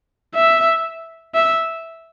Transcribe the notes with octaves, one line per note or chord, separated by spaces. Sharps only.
E5
E5